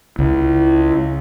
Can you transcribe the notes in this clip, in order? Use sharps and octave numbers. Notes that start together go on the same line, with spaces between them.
C#2 E4